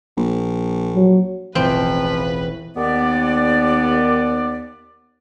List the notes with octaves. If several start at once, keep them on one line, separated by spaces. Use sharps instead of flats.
A#1
F#3
E1 A1 F3 C4 B4
D#2 B3 D5